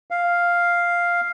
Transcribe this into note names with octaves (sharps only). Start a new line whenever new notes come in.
F5